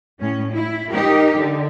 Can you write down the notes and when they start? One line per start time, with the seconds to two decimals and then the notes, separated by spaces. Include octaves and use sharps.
0.20 A2 C#4
0.52 E4
0.90 D#4 G4 A#4
1.37 D3